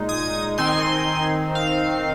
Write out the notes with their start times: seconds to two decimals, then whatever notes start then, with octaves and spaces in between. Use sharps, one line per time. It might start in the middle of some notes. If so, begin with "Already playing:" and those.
Already playing: A#2 G#3 D#4
0.09 D#6 G#6
0.58 D#3 C4 D#4 G#5 C6
1.55 F5